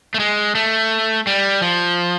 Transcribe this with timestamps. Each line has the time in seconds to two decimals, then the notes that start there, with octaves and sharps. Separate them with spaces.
0.14 A3
0.20 G#3
0.55 A3
1.27 G3
1.62 F3